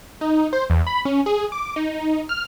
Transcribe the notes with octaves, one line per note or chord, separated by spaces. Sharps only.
D#4
C5
E2
B5
C#4
G#4
D6
D#4
F6